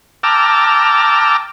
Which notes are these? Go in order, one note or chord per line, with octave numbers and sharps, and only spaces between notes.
G5 A5 A#5 D6 E6 F6